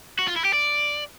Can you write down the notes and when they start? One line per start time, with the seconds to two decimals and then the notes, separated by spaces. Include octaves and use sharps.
0.19 F#4
0.27 F4
0.36 E4
0.45 G4
0.53 D5